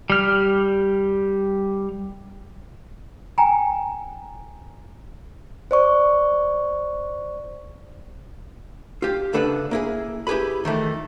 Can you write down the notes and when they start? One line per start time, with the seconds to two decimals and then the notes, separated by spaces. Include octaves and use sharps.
0.10 G3 F6
3.38 G5 G#5 A#5
5.71 C5 D5 C#6
9.02 F4 G4
9.33 C2 C#3 D4 A4 B4 F#5
9.71 A#3 E4 G#4
10.27 E4 G4 G#4 B4 B5
10.64 F2 D#3 E3 A3